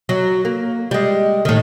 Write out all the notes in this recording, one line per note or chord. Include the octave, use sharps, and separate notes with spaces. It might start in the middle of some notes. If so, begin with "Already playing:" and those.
F#3
A#3
G3 G#3
A2 D#3